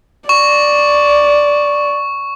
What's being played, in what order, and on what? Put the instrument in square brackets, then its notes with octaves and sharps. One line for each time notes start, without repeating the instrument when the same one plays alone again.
[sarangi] D5 [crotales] C#6